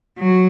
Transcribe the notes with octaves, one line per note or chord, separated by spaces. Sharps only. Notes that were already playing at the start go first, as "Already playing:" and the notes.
F#3